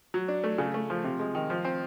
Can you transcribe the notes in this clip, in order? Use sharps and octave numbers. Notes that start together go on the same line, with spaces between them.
F#3
D4
A3
C#3
A3
F3
C3
G#3
D#3
F3
C4